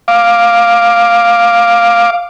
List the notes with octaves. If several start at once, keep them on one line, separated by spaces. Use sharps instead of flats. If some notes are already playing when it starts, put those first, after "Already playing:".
F5 D6